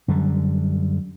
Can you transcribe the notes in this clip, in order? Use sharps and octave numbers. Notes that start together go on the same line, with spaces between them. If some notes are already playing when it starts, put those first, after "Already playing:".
F#2 D3 G3